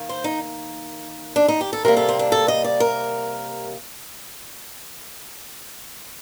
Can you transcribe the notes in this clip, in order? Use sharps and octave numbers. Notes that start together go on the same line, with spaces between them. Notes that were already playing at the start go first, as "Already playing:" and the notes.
Already playing: D#3 A#3
C5
D#4
D4
D#4
G4
A4
C3 G3 A#3 A#4
A4
C4
D4
A4
D#5
D5
A#4